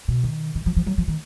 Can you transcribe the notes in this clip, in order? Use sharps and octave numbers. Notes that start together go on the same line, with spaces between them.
B2
D#3
D#3
F3
F3
F#3
F3
D#3